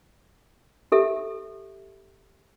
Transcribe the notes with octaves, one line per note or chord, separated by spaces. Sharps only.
G4 A4 E5